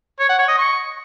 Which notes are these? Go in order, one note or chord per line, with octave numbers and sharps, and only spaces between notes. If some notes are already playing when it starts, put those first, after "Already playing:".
C#5
F#5
C#5
D#5
C#6